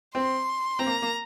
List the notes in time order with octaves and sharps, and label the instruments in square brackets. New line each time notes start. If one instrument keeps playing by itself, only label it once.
[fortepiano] C4 [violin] C6
[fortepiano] C4 [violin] A#5
[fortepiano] A#3
A#3